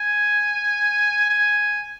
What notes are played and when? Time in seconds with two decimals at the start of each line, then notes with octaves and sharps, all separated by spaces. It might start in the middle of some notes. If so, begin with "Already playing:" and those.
Already playing: G#5
1.30 G#5